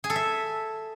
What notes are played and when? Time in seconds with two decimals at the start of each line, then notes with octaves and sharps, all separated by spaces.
0.04 G#4
0.10 A4
0.16 E5